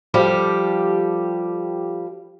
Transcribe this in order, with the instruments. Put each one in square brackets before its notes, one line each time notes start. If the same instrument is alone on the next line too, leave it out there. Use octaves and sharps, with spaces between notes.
[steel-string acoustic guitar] F3 G3 G4 A4